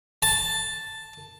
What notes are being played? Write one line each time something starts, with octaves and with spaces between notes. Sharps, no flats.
A5